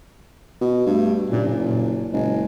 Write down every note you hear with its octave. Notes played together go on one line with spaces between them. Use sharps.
B2
G2 A3
F#1 A#2
A#2
F#1 G#3